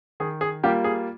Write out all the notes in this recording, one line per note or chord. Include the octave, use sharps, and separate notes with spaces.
D#3 G#4
G#4
G3 A#3 F4 G4
G#4